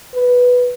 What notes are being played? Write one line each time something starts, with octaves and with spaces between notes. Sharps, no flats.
B4